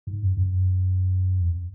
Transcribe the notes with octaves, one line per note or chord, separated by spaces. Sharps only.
G#2
F#2
F#2
F2